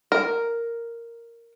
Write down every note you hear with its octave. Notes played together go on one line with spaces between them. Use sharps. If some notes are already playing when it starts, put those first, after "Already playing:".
A#4